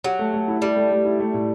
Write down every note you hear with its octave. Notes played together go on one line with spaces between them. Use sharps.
F#3 G4
A3
A3
E4
G3 G4
A3
A3
E4
A3
A2